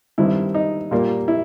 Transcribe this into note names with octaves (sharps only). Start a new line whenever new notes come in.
G2 D#3 G3 C4 E4
D#4
A#2 G3 A#3
E4